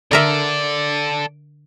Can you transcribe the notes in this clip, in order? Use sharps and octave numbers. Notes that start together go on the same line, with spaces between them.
D3 A4 A#4 D5 E5